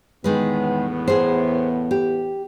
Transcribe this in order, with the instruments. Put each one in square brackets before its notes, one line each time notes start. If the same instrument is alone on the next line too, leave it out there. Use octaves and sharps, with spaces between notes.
[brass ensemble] E2 A2 B3 [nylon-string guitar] D#3 G#3 B4
[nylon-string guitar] G#4 C5
G4